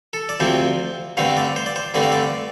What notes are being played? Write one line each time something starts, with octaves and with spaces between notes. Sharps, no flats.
A4
D5
D2 C3 F3 C4 C5
G2 D3 A3 C4 F5
D5
C5
D5
C5
G2 D3 A3 C4 D5
F5
D5